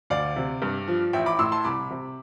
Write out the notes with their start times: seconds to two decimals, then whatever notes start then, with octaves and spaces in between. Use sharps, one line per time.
0.10 D2 D5 F5
0.36 C3
0.62 G2
0.88 F3
1.13 A1 E5 G5
1.26 B5 D6
1.39 A2 C6 E6
1.52 A5 C6
1.64 C2 B5 D6
1.90 C3